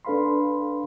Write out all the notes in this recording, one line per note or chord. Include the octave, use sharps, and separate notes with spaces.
D4 A4 B4 F5 B5 C6